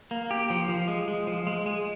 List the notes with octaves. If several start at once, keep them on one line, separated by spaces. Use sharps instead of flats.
A#3
G4
F3
F3
G#3
G#3
F3
G#3
G#3